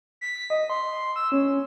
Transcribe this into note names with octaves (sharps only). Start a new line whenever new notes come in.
B6
D#5
C6
E6
C#4